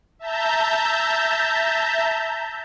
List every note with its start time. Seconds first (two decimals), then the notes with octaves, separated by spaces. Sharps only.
0.19 E5 A5 A#5 G6